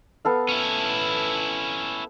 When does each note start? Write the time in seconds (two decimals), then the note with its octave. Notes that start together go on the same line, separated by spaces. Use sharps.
0.25 B3 A4 F5
0.49 C#4 E4